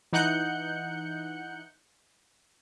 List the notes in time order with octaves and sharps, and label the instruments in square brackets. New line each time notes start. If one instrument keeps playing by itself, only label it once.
[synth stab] E3 D#4 F#5 F#6 G6 C#7